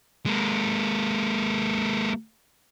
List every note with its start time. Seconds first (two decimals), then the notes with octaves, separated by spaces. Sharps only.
0.26 G#3 A#3